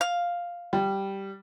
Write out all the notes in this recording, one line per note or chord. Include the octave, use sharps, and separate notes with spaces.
F5
G3